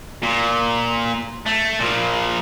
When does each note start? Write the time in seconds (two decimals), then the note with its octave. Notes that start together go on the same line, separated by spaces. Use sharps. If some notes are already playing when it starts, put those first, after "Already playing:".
0.23 A#2
1.46 A3
1.80 A#2 F3